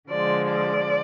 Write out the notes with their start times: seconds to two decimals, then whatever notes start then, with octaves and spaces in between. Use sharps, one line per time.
0.09 D3 F3 G#3 D5
0.50 D5